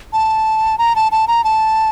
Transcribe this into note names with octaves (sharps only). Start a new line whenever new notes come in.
A5
A#5
A5
A5
A#5
A5